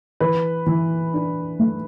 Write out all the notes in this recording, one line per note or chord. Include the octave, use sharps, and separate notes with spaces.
E3 B4
E3
D4
A3